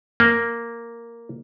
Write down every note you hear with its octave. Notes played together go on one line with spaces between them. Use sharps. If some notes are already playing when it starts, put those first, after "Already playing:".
A#3